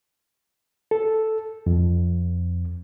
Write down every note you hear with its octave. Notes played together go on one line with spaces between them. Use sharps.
A4
F2